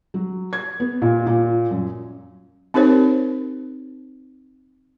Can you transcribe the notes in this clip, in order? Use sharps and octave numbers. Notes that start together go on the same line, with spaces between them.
F#3
G#6
B3
A#2
A#2
F#2
C4 D#4 G4 A#4 C5 C#5